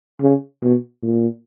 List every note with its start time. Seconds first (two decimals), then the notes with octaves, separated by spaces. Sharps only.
0.21 C#3
0.62 B2
1.03 A#2